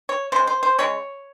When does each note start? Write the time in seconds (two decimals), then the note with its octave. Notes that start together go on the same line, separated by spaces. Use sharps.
0.09 C#5
0.32 C#3 G#3 C5
0.47 C5
0.63 C5
0.79 C#3 G#3 C#5